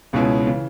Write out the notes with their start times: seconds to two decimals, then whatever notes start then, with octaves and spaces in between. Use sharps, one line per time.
0.13 C#2 B2 G#3 C#4 E4
0.47 C#3 E3